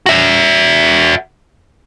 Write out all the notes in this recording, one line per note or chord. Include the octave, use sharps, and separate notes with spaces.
F#4 E5